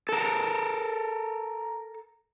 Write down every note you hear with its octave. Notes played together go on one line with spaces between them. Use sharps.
A4 A#4